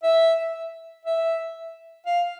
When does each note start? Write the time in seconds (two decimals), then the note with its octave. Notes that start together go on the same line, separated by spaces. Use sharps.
0.03 E5
1.05 E5
2.06 F5